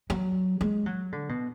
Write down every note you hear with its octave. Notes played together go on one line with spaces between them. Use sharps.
F#3
G#3
F#3
D3
B2